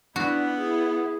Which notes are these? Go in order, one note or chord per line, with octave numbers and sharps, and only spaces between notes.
B3 D4 E4 F#4
E4 G#4